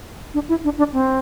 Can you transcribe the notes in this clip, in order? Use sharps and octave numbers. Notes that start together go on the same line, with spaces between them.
D4
E4
D4
D4
C4